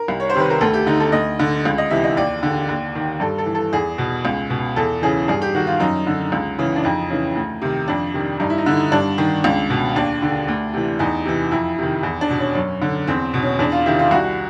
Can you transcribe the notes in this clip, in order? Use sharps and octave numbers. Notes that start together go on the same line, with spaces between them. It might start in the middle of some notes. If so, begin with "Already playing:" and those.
Already playing: A#4
C2
C#5
C5
C3 D#3 B4
A#4
D2 A4
G4
D3 D#4
A4
D2 D#5
D3
C#2
D#5
C3 E3 E5
D#5
D#2 D5
D3
D#2
D#3
G2 A4
A4
E3
A4
E2 G#4
B2
C#2
B2
E2 A4
C#3 E3 G#4
G2 G#4
G4
D#3 F#4
F4
F#2 D#4
D3
C#2
C#3 E3
D4
F2 D#4
C#3 E3
D2
C3 D#3
F2 D4
C3 D#3
G2 D#4
E4
D#4
D3 E4
D#4
G2 D4
D#3
C#2 D4
B2
D#2 D4
D3
D2
C3 E3
E2 D#4
C3 E3
F2 E4
C3 D#3
E2
D4
B2
C#4
F#2 C#4
D3
E2 C4
B2
C#4
E2 D4
F4
C3 D#3 E4
F4
C2 F#4